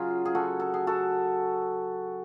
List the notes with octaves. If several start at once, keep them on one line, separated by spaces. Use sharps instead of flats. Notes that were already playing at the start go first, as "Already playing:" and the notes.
Already playing: C#3 F#3 F4 G#4
G#4
F#4 A4
A4
G#4
F#4 A4